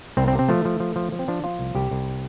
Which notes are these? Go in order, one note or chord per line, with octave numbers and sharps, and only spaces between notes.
C2 C4
C4
C3
C4
F3 A3
F3
F3
F3
F3
C4
F3 D4
F3 F4
C2
C2 G4
C2